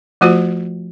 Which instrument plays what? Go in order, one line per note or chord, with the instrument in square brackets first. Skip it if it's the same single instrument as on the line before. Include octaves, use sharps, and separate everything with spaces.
[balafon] F3 A3 F4 F#4 C5